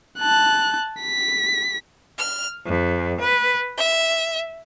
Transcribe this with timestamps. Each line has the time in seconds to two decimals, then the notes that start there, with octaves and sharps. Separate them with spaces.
0.19 A5 F#6
1.01 B6
2.18 F6
2.65 F2
3.20 B4
3.78 E5